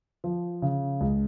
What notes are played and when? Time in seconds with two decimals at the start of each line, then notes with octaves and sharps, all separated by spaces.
0.24 F3
0.62 C#3
1.01 C#2